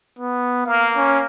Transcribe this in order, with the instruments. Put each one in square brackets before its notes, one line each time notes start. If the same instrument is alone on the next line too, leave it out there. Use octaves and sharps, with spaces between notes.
[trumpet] B3
[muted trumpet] A#3 [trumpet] F5
[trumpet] C#4